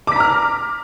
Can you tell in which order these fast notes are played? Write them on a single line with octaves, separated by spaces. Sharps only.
D6 B6 A#5 F6